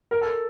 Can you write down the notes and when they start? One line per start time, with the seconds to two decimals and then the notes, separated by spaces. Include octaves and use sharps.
0.11 A#4
0.21 A4